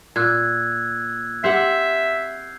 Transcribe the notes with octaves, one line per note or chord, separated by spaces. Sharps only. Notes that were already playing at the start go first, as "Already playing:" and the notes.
A#2 E6 F#6 G#6
C4 G4 E5 F#5 G6 C7